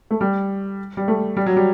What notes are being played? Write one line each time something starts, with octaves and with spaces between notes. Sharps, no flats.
A3
G3
G3
A3
G3
F#3
G3